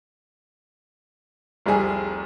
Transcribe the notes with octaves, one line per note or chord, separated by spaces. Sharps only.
F1 C2 G3 G#4 G#5